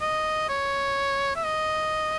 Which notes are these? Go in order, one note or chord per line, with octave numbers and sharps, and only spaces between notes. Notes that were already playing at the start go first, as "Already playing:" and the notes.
D#5
C#5
E5
D#5